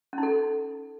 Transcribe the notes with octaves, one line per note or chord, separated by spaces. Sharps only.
C#4 D#4 A4